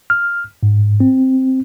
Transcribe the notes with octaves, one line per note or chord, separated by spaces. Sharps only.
F6
G#2
C4